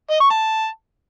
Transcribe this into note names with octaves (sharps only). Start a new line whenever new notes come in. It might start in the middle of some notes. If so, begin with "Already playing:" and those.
D#5
C#6
A5